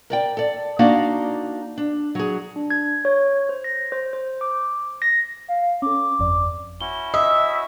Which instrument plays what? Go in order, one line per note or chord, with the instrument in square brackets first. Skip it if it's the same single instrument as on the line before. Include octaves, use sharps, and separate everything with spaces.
[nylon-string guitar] A#4 D5 G5
A4 D5
A#3 D4 D#4 F#4 D5 F5
D4
F#3 G#4
[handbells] D4
G#6
C#5
C5
A#6
C5
C5
D6
A#6
[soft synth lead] F5
[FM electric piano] C#4 A4 [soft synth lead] D6
[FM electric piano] G1 F2 D5
[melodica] C#4 E4 F#4 [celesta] G7
[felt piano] D#5 [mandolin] E5 [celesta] D#6 E6